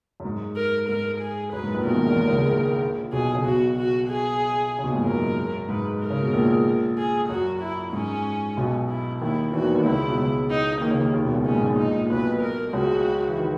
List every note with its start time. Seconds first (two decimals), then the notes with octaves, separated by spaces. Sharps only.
0.20 F#2
0.25 G#2
0.56 A#4
0.89 G#2 A#4
1.21 G#4
1.53 F#2 B4
1.64 G#2
1.74 A#1 A#2
1.85 B1 B2 A#4
1.95 D#2 D#3
2.06 E2 E3
2.16 D#2 D#3
2.28 C#2 C#3
2.38 C#2 C#3
2.49 A#1 A#2
3.12 B1 B2 G#4
3.35 C#3
3.45 B1 B2 F#4
3.77 F#4
4.09 G#4
4.79 C#3
4.84 B1 B2
4.90 A#2
4.94 G#2
5.05 F#2 A#4
5.69 G#2 B4
6.01 A#4
6.10 C#3
6.22 B2
6.33 A#1 A#2
6.98 G#4
7.29 F#2 F#4
7.61 E4
7.93 G#2 C#4
8.57 B1 B2
8.89 E4
9.21 D#2 D#3 E4
9.53 E2 E3 F#4
9.64 D#2 D#3
9.75 D#2 D#3
9.85 C#2 C#3 E4
10.06 B2
10.18 C#2 C#3
10.50 D#4
10.81 D#3 A#3
10.91 C#3
11.01 D#2 D#3
11.14 D#2 D#3
11.24 B1 B2
11.35 C#2 C#3
11.46 A#2 C#4
11.55 G#2
11.63 A#1 A#2
11.78 D#4
11.99 A#2
12.10 B1 B2 B4
12.42 A#4
12.73 C#2 C#3 F#4
13.28 E3
13.38 D#3